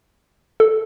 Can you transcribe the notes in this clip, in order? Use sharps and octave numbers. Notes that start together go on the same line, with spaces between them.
A4